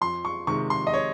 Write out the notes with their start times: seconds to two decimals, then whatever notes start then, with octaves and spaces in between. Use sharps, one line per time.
0.01 F2 C6
0.25 C#6
0.47 C3 D#3 G#3 C#6
0.70 C6
0.87 D#5
0.94 C#5